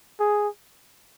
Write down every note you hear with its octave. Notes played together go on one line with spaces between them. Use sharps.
G#4